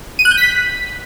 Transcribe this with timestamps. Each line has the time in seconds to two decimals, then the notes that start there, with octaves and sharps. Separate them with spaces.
0.19 D#7
0.25 F#6
0.31 G6
0.38 B6